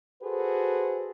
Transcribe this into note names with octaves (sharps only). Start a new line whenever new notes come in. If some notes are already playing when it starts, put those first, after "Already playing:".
F#4 G#4 A4 B4 C5